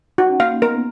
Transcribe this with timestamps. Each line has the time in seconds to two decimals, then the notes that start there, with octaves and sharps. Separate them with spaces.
0.18 D#4 F#4
0.30 C#4
0.40 A#3 F5
0.62 B3 A#4